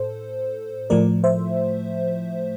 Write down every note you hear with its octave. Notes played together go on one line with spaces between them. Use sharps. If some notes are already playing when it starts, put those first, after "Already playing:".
Already playing: A2 A4 C5
A2 F3 A3 A#4 D5
C5 E5